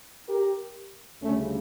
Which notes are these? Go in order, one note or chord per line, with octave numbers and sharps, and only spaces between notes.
G4 A#4
D2 C#3 G3 A3 C#4